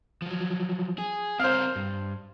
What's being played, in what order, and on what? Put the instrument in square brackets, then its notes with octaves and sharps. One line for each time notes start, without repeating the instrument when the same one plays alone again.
[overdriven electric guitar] F3 F#3
G#4
[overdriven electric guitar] C4 A#4 [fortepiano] C5 F5
[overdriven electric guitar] G2